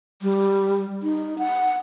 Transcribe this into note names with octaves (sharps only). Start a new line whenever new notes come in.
G3
D#4
F#5